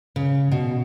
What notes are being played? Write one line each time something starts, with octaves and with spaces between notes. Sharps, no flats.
C#3
B2